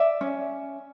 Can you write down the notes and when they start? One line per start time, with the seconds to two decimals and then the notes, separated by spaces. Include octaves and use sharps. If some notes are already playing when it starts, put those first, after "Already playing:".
Already playing: D5 E5
0.21 C#4